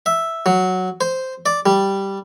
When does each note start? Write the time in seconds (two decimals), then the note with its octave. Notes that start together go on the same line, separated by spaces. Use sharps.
0.06 E5
0.46 F#3
1.01 C5
1.46 D5
1.66 G3